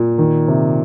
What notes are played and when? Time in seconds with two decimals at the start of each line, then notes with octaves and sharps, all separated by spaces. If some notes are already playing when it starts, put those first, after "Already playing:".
Already playing: A#2
0.18 D#3
0.48 C3